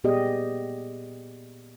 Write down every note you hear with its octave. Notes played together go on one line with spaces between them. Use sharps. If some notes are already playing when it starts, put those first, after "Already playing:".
A#2 B3 G4 G#4 D5 D#5